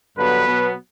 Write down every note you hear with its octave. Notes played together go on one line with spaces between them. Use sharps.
G2 D3 F#3 B3 B4
B2 F#3 B3